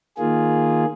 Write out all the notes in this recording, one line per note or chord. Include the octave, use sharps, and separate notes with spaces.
D#3 A#3 F4 G#4